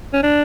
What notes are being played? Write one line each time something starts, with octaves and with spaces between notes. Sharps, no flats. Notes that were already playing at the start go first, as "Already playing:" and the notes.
C#4
D4